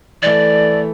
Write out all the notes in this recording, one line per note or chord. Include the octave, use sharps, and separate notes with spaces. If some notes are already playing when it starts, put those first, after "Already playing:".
E3 A3 D5